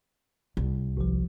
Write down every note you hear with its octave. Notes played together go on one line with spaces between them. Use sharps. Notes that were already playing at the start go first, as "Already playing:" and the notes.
C2
G#1 F3